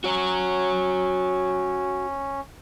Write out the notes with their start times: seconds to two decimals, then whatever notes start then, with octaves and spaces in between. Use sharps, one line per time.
0.04 C#4 F#4 C#5